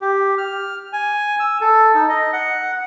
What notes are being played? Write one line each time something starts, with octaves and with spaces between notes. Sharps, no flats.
G4
F6
G#5
E6
A4
D#4
D#5
F#5